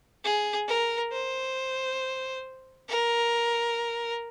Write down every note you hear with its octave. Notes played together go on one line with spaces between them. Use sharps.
G#4
A#4
C5
A#4